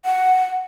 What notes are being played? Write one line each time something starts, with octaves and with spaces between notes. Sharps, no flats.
F#5